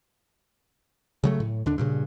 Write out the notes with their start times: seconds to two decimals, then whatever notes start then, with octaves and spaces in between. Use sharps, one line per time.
1.24 C#3 F#3 A3
1.40 A2
1.66 D#2 D3 D4
1.78 G2 A#2 C#3